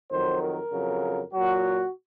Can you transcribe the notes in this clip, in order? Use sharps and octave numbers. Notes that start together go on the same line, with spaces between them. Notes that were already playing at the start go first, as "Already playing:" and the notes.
F2 D#3 F#3 C5
A#4
F2 C#3 F#3
A#2 F#3 F#4